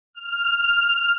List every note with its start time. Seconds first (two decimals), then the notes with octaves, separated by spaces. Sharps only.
0.13 F6